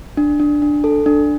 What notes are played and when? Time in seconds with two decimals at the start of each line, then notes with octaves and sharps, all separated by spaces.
0.17 D4
0.40 D4
0.62 D4
0.84 A4
1.06 D4